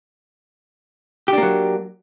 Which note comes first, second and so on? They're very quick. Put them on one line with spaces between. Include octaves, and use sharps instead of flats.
G4 D4 A#3 F#3